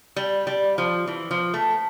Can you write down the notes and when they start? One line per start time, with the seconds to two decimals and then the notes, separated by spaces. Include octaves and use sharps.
0.16 G3
0.47 G3
0.78 F3
1.07 E3
1.31 F3
1.54 A3